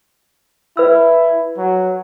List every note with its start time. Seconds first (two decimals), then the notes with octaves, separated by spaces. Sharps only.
0.77 E4 B4 E6
1.57 F#3